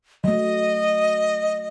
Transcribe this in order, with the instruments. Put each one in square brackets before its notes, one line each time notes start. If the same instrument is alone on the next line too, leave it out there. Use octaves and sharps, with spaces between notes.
[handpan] F#3 A3 [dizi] D#5